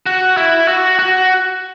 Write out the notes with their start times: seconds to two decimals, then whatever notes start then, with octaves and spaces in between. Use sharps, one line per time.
0.06 F#4
0.37 E4
0.68 F#4
0.99 F#4